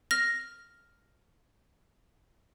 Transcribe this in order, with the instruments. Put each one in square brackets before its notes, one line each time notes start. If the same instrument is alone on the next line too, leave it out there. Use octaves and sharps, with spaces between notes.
[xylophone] F6 A#6